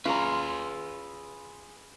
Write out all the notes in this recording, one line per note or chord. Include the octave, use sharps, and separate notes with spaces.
C#4 F4 G#4 B4 A#5